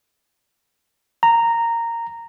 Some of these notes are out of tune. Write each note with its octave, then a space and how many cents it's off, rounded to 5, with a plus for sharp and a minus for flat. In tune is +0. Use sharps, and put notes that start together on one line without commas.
A#5 -10